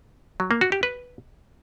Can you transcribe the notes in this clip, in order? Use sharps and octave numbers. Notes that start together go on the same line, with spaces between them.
F#3
A#3
F#4
G4
B4